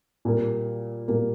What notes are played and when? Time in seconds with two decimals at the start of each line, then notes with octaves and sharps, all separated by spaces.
0.25 A#2 G3 A#3
1.08 A#2 G3 A#3